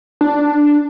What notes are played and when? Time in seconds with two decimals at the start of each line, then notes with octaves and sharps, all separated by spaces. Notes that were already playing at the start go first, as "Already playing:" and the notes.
0.21 D4